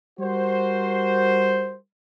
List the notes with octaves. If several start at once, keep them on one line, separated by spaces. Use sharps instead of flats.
G3 F#4 A#4 C5